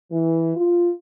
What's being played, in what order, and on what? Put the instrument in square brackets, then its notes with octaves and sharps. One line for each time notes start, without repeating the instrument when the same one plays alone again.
[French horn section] E3
F4